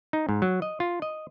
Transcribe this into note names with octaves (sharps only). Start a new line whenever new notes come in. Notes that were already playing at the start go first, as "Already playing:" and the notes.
D#4
G#2
F#3
D#5
F4
D#5